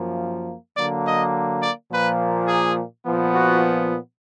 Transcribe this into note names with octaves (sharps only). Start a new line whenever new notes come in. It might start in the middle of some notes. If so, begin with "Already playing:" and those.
Already playing: F#2 F3 A#3
D3 F#3 A#3 D5
D#5
D5
A#2 F3 A#3 B4
G#4
A#2 F3 B3
F#4